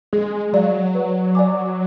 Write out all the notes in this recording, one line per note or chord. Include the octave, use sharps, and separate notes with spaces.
G#3 G#4
F#3 D5 F5
B4
D5 G#5 D6